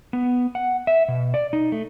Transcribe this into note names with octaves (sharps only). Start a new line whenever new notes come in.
B3
F#5
E5
B2
D5
D#4
A3